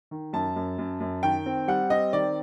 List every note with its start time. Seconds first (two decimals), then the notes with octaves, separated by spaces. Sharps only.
0.11 D#3
0.33 F#2 A5
0.56 F#2
0.78 F#2
1.00 F#2
1.23 D#3 G5
1.46 C4
1.68 G3 F#5
1.90 C4 D#5
2.13 D#3 D5